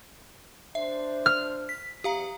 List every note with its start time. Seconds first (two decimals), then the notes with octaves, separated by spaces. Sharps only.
0.75 D4 C5 E5
1.26 F6
1.69 B6
2.04 E2 G4 F5 A#5